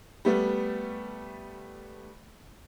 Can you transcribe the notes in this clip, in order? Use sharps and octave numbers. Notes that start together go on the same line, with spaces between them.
G3 A3 B3